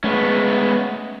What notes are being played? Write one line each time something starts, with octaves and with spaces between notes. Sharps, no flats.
G#3 A3 B3 C#4